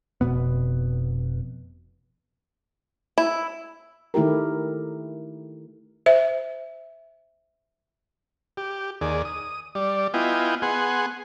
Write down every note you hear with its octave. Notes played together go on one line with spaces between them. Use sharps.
F1 E2 B2 B3
E4
D#3 A3 E4 G4 A#4
C5 E5
G4
D#2 G#4 D5
D#6
G3 D5
B3 E4 F4 D#5 G5 G#5
B3 G#4 F#5 G#5 C6